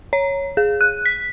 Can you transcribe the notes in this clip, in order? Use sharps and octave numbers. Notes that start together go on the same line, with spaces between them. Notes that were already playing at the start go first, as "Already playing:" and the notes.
C#5
G#4
F#6
B6